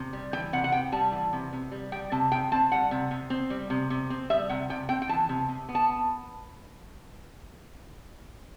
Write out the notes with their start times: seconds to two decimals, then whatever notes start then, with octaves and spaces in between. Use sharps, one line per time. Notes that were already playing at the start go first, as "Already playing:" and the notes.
Already playing: C3
0.13 G3
0.33 E3 G5
0.53 C3 F#5
0.64 F#5
0.72 C3 G5
0.92 G3 A5
1.12 E3
1.33 C3
1.53 C3
1.71 G3
1.92 G3 G5
2.12 C3 A5
2.31 C3 G5
2.52 C4 A5
2.72 G3 F#5
2.91 C3
3.11 C3
3.30 C4
3.50 G3
3.70 C3
3.90 C3
4.10 C4
4.30 G3 E5
4.49 C3 F#5
4.69 C3 G5
4.89 C4 G5
5.02 G5
5.09 E3 A5
5.29 C3
5.49 C3
5.69 B3
5.75 A5